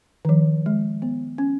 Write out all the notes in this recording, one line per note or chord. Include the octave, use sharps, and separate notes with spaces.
D#3
F3
G#3
B3
C#4